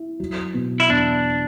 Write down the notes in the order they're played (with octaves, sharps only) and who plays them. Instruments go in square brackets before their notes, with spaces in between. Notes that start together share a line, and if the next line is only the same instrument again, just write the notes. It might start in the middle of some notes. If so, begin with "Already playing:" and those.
Already playing: [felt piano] E4
F#3
B2
[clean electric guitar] E4
[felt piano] E2 [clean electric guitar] D4